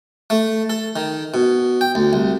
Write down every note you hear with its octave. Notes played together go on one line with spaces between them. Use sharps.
A3
A4
D#3
B2
G5
D2
C2